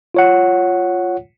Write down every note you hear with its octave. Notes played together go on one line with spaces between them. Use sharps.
F4 C#5 F#5